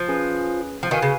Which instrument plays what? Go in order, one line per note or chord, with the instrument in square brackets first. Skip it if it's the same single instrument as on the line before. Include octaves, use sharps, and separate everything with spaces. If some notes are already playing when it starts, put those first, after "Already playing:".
Already playing: [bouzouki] F3
[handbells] C#4 G#4 B4
[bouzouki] F3
[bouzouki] D#3 [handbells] F#4 B4 F5 G#5
[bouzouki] C#3